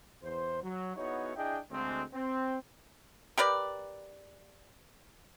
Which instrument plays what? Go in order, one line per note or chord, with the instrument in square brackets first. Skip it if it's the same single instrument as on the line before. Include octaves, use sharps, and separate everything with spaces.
[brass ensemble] E2 C5
F#3
B3 D#4 E4 F#4 G#4 C#5
D4 E4 G#4 D#5 G5
D2 G#3 C4
C4
[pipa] G4 A#4 B4 D5